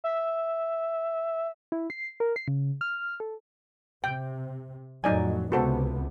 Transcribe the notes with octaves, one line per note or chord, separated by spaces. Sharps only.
E5
E4
C7
A#4
C7
C#3
F6
A4
C3 G5
F2 A2 F#3 D#4 D5 G#5
C#2 C3 B3 F#4 A4 C5